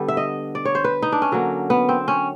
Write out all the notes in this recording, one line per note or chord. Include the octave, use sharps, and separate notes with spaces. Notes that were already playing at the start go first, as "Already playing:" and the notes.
Already playing: D3 G3 B3
E5
D#5
D5
C#5
C5
B4
D#4
D4
C#4
D3 F#3 A#3
B3
C4
C#4